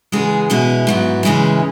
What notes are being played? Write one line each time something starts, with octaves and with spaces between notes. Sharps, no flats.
C#3 E3 G#3 B3 G#4
B2 G#3 C#4 E4
G#2 F#3 B3
C#3 E3 G#3 C#4